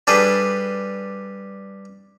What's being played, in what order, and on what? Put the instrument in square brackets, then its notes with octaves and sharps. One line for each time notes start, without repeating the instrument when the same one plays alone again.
[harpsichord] G3 D4 G#4 A4 B4